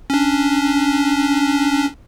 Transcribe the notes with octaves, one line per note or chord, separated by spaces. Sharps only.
C#4 D4